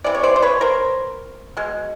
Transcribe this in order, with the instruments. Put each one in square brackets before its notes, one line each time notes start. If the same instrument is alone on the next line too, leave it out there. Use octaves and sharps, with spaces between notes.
[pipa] C3 E3 D5
C#5
C5 D5
C5
B4 C#5
A#4 C5
B2 G#3